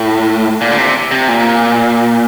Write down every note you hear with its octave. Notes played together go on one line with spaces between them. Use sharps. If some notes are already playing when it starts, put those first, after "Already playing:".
Already playing: A2
A#2
D3
C3
C3
A#2